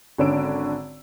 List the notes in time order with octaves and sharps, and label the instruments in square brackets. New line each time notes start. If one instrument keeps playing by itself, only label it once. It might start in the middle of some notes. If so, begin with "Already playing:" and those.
[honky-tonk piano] G#1 D3 C#4 E6 D7